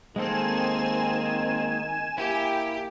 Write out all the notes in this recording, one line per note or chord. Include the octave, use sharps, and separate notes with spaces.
D#3 G#3 A#3 C4 A4 G#5 E7
A#3 E4 G4